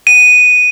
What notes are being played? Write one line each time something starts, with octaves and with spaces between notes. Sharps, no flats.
D#7